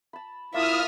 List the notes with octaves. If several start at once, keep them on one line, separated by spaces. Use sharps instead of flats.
A5 B5
A#3 E4 F4 E5 A5 D#6 F6